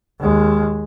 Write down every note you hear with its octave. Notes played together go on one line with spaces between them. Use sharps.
D#2 G#3